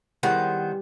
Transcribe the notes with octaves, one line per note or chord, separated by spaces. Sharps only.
D#3 G3 B3 E4 G#4 C5 F#5 F#6